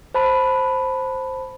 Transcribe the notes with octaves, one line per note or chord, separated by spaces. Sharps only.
C5 A5 B5